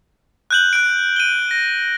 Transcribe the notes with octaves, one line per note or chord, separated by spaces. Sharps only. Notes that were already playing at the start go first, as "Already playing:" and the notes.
F#6 G6 F#7
F#6 D7
D#7 G7
A#6